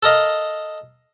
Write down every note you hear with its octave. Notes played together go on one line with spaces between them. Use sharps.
A4 A#4 D#5 F5